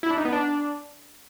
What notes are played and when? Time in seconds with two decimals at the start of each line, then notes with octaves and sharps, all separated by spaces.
0.03 E4
0.10 D4
0.18 D#4
0.25 B3
0.32 D4